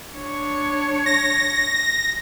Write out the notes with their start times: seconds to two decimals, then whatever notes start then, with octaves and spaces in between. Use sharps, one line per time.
0.13 D4 C#5
1.06 A#6